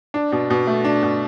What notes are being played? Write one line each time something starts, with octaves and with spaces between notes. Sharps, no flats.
D4
B2
B2
A3
D4
B2